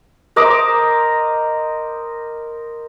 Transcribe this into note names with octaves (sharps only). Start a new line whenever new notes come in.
A#4 C5 D#5 D6